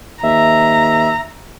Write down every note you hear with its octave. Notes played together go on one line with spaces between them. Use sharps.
D#2 E5 A#5